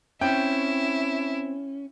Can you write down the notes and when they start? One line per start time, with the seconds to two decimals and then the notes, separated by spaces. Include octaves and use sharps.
0.21 C4 C#4 E4 G5